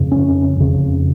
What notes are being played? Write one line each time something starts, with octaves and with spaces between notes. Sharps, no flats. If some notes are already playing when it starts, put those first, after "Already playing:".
Already playing: F2 C#3
C#4
F2 C#3